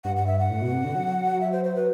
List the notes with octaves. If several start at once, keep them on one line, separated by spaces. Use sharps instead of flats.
G2 F#5
F#5
E5
F#5
A2
B2
C3
D3
F#3
E5
C5
C5
B4